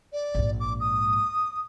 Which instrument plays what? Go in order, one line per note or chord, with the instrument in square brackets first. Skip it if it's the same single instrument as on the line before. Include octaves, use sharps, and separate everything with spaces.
[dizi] D5
[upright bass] A#1 G#2
[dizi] D6
D#6